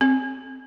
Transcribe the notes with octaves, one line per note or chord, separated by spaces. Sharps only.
C4